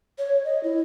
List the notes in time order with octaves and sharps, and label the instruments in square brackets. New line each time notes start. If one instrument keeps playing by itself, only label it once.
[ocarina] C#5
D#5
E4